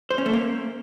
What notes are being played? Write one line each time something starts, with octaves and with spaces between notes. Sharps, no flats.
C5
C#4
A3
A#3